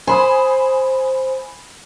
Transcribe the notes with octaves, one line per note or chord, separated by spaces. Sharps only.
C5 G#5 B5 D#6